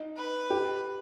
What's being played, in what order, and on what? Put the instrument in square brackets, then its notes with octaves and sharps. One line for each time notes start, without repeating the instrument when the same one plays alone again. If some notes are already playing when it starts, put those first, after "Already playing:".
Already playing: [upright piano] D#4
[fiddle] B4
[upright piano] G4